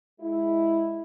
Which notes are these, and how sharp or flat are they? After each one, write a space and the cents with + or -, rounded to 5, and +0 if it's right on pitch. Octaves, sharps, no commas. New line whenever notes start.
G#3 +0 E4 +0